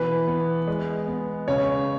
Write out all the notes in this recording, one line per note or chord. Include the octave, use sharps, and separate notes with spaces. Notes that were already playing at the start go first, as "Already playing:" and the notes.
Already playing: B2 E3 B4
B3
G#3
B3
C#3 C#5